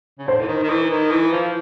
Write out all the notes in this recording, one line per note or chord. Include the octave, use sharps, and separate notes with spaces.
C#3
D3 C5
E3
D#3
D#3
E3
D#3
E3
F3